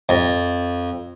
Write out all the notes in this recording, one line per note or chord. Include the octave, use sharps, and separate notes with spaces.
F2